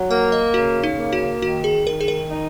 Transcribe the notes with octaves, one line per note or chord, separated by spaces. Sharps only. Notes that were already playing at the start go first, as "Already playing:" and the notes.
Already playing: F#3
A#3 F#5
D#5
C#3 F#4
D#4
A#3
F#4
D#3 F#4
G#4
D#3 A#4
G#4
A#4
D#4